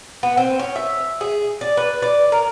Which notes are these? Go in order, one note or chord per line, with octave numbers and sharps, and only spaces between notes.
B3
C4
C#4
E5
G#4
D5
B4
D5
A#4